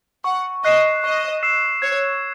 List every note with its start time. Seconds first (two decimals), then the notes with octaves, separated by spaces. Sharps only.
0.24 F#5 C#6
0.64 D#5 F#6 C7 E7
1.04 D#5 C#6
1.43 E6 C7 E7
1.82 C#5 G#6